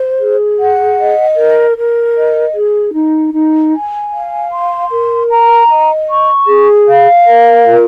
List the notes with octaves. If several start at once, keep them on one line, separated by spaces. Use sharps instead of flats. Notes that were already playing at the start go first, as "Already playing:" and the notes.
Already playing: C5
G#4
F#5
D#5
A#4
A#4
D#5
G#4
D#4
D#4
G#5
F5
C6
A#4
A#5
D#5
C#6
G#4
F5
A#4
F4